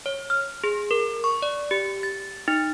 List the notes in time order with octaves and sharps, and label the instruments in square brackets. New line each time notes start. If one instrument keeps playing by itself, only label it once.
[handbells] C#5
F6
G#4
A#4
C#6
D5
G4
A6
D#4